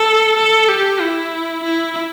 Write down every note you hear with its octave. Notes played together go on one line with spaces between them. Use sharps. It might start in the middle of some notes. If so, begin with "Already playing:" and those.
Already playing: A4
A4
G4
E4
E4